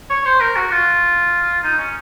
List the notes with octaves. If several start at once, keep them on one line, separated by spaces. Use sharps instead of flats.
C#5
C5
A#4
F#4
F4
D#4
C#4